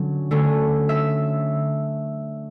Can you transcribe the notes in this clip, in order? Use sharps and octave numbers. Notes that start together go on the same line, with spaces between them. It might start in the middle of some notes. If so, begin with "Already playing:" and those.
Already playing: D3 F#3 C#4
D3 A3 C#4
E5